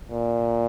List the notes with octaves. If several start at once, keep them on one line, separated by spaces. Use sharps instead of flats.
A#2